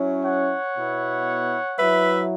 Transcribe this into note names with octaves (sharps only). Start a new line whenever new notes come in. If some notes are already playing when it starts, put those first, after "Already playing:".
Already playing: F#3 C#4 E4
C#5 F#5
B2 B3 E4
F#3 E4 B4 E5